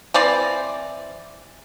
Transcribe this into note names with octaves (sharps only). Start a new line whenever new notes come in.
E3 C4 D5